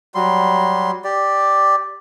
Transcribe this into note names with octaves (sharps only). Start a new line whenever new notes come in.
F#3 G3 C6
G4 D5